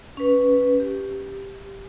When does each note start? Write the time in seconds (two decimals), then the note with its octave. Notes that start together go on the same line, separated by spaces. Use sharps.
0.17 C#4 B4
0.80 G4